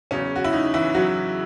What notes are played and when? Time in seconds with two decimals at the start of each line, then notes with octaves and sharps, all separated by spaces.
0.11 E2 C#3 F#3 C#4
0.36 F#4
0.44 E4
0.53 D#4
0.74 E3 E4
0.94 F#3 F#4